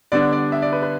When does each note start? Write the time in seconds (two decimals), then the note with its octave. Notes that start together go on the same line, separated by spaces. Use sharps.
0.12 D3 G3 B3 D4 D5
0.32 D5
0.52 E5
0.62 D5
0.72 B4
0.83 B4